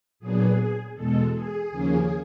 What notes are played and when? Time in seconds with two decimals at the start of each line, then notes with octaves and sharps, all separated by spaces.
0.20 A#2 F#3 B3 D4 G#4
0.95 E2 B2 G#3 A4
1.33 G#4
1.71 D#2 C#3 F3 A#3 C#4